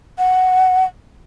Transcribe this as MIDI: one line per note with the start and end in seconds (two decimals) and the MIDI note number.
0.18 0.84 78